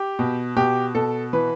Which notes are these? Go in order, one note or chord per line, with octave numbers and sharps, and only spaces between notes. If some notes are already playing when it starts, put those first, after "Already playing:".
Already playing: G4
B2
B2 G4
B2 A4
E3 B4